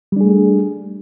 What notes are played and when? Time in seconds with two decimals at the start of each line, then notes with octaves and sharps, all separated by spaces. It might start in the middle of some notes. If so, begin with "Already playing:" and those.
0.12 G3
0.16 D4
0.21 G#4
0.25 A3